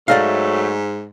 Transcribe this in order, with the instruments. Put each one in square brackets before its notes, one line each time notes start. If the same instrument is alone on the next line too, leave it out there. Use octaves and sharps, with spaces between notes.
[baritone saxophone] G#2 [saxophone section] F#3 A3 [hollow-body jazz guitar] D5 D#5 F5